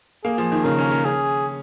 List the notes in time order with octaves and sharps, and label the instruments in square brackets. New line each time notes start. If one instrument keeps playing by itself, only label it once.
[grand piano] A#3 [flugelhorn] G#4
[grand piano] F3
D#3
[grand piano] C#3 [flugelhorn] A#4
[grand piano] C#4
C#4
[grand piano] C#4 [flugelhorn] G#4